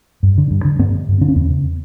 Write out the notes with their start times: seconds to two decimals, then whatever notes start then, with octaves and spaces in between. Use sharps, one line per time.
0.23 G2
0.38 D3
0.51 G2
0.65 D3
0.79 G2 B3
0.94 D3
1.08 G2
1.21 D3 D4
1.28 C#4
1.35 E2 B3
1.50 C#3